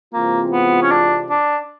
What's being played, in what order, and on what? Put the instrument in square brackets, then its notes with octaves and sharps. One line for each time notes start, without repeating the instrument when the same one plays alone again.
[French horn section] C3 E3 G#3 C4 F4 [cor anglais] A#3
[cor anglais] B3
C#4
D4
D4